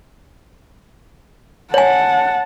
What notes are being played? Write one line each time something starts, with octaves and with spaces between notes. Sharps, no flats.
C#5 F#5 G#5 A5